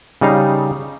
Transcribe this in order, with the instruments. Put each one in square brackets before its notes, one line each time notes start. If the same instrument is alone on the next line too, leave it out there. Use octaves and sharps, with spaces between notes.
[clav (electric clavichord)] C#3 G3 D#4 F5